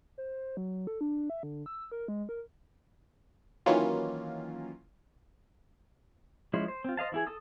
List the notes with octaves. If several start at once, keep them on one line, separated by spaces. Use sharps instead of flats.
C5
F#3
A4
D4
E5
D3
E6
A#4
G#3
A#4
D#3 E3 F#3 A#3 C#4 F4
F3 G#3 C#4 E4 C5
C5
C4 F4
C5 D#5 F5 A5
E3 E4 G#4
A4 A5 D#6 E6